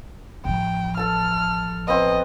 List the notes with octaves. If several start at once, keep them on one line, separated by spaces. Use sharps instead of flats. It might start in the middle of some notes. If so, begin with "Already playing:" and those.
A1 F3 G5
A4 A5 F6
B3 C4 F#4 D#5